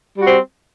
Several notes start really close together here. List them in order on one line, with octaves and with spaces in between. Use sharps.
G3 F#4 C4